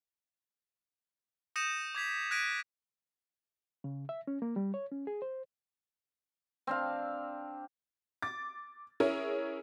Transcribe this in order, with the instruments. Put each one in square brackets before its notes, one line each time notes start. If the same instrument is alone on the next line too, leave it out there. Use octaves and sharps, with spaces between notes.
[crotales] D#6 G6 A#6 C#7 D#7 E7
D6 G#6 B6 F7
F#6 G#6 A#6 B6 D7 D#7
[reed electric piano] C#3
E5
C#4
A#3
G3
C#5
C#4
G#4
C5
[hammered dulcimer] C4 D4 F5
[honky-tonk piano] D6 A6
C#4 E4 G#4 A#4 C#5